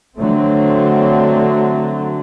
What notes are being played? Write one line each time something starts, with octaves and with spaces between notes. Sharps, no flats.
D3 F#3 A3 C4